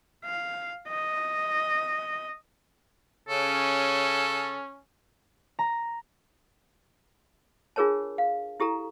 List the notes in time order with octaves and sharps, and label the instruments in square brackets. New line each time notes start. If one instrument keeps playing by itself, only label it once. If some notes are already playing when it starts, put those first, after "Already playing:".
[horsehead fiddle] F5
D#5
[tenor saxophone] C#3 [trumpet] C#4 [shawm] A4
[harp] A#5
[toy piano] D4 F4 G#4 A#4 C#5 A5
F5
E4 G4 A4 A#5